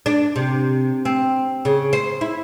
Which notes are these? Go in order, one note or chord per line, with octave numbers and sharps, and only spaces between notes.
D4
C3
C4
C#3
C5
E4